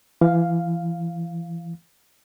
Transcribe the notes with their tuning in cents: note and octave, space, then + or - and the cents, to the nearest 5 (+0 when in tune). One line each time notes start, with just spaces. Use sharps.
E3 +30 F5 +0